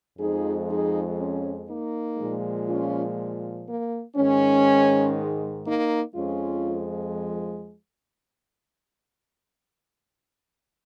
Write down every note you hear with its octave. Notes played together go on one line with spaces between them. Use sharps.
F2 F3 G#3 D#4 G#4
D#4 G#4
C#4
A#3 D#4
A#2 F3 G#3
C#4 F4
A#3
G#2 D#3 G#3 C#4
A#3 D#4
F2 F3 G#3 C#4 F4